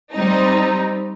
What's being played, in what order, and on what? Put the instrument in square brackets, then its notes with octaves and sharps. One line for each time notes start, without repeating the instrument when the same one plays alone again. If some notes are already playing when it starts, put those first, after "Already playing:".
[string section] G3 C4 D#4